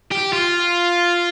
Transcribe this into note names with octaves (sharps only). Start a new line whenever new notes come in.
G4
F4